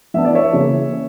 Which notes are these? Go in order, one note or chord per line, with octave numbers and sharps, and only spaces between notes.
E3 B3 D4 E5
D5
C#5 E5
C#3 E3 A#3
C#4